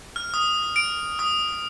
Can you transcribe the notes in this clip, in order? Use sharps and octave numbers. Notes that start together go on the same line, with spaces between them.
F6
D#6
D7
D#6